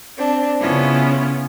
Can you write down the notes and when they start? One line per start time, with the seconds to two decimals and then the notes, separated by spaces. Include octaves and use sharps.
0.18 C4 D4
0.61 C#3 B3 C#4 E4 F4